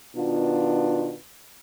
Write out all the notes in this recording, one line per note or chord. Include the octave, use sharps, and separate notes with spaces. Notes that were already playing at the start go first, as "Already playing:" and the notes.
B2 D#3 B3 D4 F4